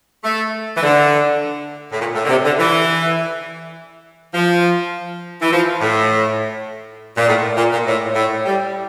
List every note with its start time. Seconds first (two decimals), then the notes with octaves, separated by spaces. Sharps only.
0.24 A3
0.76 E3
0.83 D3
1.92 A2
2.00 A#2
2.15 A2
2.24 D3
2.29 C3
2.45 D3
2.58 E3
4.34 F3
5.41 E3
5.52 F3
5.81 A2
7.17 A#2
7.28 A2
7.57 A#2
7.72 A#2
7.86 A2
8.15 A2
8.45 G3